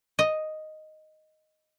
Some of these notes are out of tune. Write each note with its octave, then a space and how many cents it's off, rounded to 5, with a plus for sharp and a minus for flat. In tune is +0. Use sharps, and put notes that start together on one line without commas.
D#5 +0